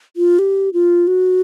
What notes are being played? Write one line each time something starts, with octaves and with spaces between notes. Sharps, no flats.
F4
G4
F4
F#4